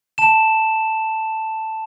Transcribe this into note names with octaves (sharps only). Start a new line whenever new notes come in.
A5 E7